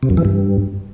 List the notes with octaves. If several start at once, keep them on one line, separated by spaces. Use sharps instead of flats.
C3
F#2
E3
G2